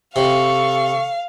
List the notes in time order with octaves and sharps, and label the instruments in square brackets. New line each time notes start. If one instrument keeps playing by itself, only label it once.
[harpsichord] C3 [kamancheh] A4 C#6 [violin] F5